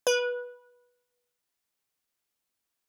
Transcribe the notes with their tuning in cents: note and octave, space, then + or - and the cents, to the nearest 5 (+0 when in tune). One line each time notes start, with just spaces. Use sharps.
B4 -15